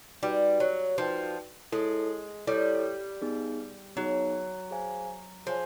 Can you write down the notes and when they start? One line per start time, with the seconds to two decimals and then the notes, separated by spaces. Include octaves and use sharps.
0.23 G3 D#4 F#4 B4 D5 G5
0.60 F#3
0.98 F3 D#4 F#4 B4 D5 G5
1.72 G#3 E4 A4 C#5
2.47 G3 E4 A4 C#5
3.22 B3 D#4 G#4
3.96 F#3 B3 D#4 G#4
4.71 G#4 C5 F5 G#5
5.46 F3 G#4 C5 F5 G#5